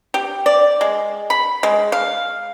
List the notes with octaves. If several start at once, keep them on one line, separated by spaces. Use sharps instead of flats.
G4
D5
G#3
B5
G#3
F5